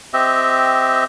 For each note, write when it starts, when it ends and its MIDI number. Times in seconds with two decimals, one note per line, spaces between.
0.13 1.04 60
0.13 1.04 67
0.13 1.04 75
0.13 1.04 76